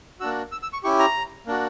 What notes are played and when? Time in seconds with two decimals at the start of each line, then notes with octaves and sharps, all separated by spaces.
0.20 A#3 D4 F#4 E6
0.52 E6
0.62 E6
0.73 C#6
0.83 C#4 E4 G4 C#6
0.99 A#5
1.46 A#3 D4 F#4